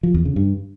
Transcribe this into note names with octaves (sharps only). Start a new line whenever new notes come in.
F3
E2
C#3
G2